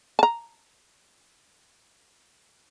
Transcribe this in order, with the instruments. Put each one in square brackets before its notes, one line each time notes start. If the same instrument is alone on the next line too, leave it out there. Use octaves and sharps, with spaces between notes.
[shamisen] A5 A#5